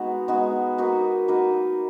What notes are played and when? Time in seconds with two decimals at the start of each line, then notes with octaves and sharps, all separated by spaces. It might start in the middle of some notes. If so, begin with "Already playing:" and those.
Already playing: G#3 B3 D#4 F#4
0.28 G#3 B3 D#4 F#4
0.78 A#3 D#4 F#4 B4
1.28 A#3 D#4 F#4 B4